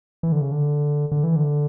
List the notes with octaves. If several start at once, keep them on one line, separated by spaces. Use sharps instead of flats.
E3
D3
C#3
D3
D3
E3
D3